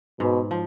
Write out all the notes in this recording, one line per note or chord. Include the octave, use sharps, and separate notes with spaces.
G#2 B2
F3